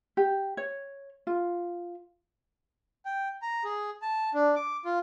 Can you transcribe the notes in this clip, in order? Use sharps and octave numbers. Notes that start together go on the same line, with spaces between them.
G4
C#5
F4
G5
A#5
G#4
A5
D4
D6
F4